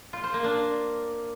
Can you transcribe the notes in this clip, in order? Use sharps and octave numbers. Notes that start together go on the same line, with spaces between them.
F4
C5
A#3
D4